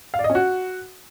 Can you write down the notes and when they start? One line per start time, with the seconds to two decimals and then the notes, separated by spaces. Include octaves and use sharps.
0.14 F5
0.19 D5
0.24 D#5
0.30 C#4
0.35 F#4